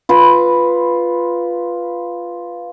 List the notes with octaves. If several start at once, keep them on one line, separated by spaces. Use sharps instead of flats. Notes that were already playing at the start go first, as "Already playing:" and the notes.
F4 B4 B5